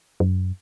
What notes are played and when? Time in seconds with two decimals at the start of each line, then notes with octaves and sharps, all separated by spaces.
0.20 F#2